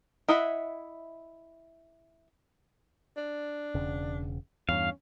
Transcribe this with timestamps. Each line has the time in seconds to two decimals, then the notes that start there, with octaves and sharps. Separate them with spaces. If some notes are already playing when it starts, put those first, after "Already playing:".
0.29 E4 D#5 E5 F#5
3.17 D4
3.75 E1 C#3
4.69 E2 G2 C#4 F5